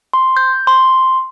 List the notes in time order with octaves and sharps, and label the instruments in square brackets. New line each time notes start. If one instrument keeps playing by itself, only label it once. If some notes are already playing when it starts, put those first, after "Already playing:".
[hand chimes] C6
G6
C6